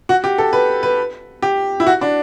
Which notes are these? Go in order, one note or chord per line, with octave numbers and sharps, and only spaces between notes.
F#4
G4
A4
B4
B4
G4
E4
F#4
D4